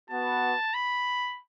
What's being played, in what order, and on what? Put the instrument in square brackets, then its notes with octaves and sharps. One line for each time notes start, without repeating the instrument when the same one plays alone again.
[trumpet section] B3 F#4 B4 F#5 [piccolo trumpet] A5
[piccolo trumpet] B5